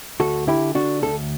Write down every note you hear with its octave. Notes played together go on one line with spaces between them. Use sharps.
D2 F#4 A4
D3 E4 G4
D3 D4 F#4
D2 A4